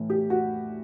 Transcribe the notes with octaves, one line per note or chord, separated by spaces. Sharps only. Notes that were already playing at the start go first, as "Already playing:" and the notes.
Already playing: A2 E3
G4
F#4